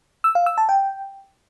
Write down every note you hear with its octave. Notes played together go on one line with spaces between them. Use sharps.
E6
F5
E6
A5
G5